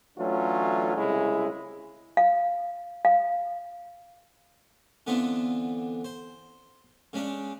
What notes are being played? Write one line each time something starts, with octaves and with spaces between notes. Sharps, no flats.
E3 F#3 A3 C#4 D4 F4
C2 C#3 G#3 E4
F5
F5
D3 E3 B3 C4 D4 F4
C5
C#3 G#3 C#4 D4